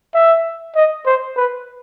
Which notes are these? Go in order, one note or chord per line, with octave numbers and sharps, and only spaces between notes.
E5
D#5
C5
B4